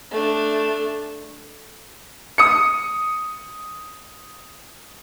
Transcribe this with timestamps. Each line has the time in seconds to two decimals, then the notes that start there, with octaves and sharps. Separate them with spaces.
0.11 A3 D4
2.38 D#6 C#7